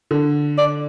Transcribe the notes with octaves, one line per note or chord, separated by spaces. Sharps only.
D3
D5